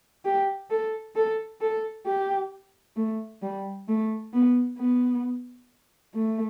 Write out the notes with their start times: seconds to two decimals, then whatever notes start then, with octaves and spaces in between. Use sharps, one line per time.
0.25 G4
0.70 A4
1.16 A4
1.61 A4
2.06 G4
2.96 A3
3.42 G3
3.88 A3
4.33 B3
4.78 B3
6.15 A3